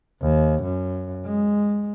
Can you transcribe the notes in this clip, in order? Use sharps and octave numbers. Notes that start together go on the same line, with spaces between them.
D#2
F#2
G#3